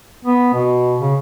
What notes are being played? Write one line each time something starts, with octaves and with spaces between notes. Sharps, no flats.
B3
B2
C#3